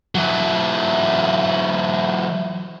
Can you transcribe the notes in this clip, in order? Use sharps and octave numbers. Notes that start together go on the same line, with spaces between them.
E3 F#3